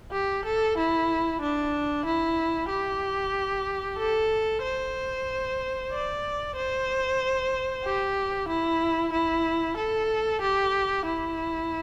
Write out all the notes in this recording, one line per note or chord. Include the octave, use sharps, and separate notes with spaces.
G4
A4
E4
D4
E4
G4
A4
C5
D5
C5
G4
E4
E4
A4
G4
E4